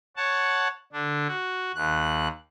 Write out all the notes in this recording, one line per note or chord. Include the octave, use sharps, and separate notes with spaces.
C#5 F#5 A5
D3 D4
F#4
D#2 F#6